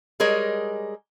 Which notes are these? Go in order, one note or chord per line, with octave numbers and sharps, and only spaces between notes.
G3 G#3 G#4 A#4 C#5 D#5